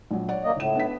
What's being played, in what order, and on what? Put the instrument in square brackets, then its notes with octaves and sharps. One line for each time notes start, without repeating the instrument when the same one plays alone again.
[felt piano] A#1 F#3
C#5 D5 F#5
[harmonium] D2 A#3 D#5
[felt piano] C#2 E7 [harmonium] A2
[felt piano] B3 D4 B6